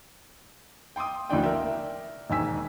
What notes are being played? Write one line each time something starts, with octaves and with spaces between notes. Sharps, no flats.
G5 C6 D6 D#6
F1 D2 A2 D#3 D4 G5
A#4 D5 E5 G5
E1 D#2 G#2 G#5 E6 B6